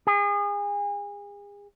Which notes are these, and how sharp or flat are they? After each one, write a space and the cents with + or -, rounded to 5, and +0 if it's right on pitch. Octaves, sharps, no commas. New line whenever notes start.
G#4 -35